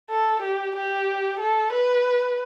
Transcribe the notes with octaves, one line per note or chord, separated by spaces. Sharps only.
A4
G4
G4
A4
B4